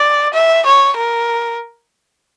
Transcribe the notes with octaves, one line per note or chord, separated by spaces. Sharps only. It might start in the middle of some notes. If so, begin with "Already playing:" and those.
Already playing: D5
E5
C#5
A#4